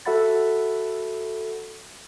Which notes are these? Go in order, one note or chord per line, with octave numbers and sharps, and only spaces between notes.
F#4 A4 E5 F#5 B5 A6